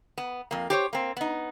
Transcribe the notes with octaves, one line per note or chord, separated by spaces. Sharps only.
B3
F2 A#3
G4 C5 C#5
A#3 C4
B3 D#4